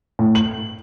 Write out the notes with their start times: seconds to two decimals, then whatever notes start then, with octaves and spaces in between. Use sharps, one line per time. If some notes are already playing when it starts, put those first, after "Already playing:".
0.19 A2
0.35 F#7